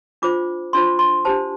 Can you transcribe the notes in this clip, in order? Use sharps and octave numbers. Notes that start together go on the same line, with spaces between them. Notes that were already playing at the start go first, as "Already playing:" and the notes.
D4 F4 C5 D6
D4 F4 C5 C6
C6
D4 G4 C5 A5